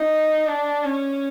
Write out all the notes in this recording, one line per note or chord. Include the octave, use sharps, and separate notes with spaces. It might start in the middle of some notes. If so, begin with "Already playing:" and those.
Already playing: D#4
D4
C#4